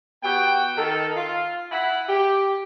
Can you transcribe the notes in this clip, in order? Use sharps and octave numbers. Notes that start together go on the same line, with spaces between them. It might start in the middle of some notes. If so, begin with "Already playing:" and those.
B3 F#4 G4 G5
D#3 A4
F4
E4 F#5 G#5 B5
G4